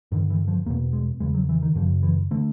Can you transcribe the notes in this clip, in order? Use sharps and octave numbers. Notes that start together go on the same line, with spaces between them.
G2 D3 D#3
E3
F3
E2 B2 A#3
G#3
E2 C#3 G#3
F#3
E3
D#3
F#2 C#3 F3
E3
D3 A3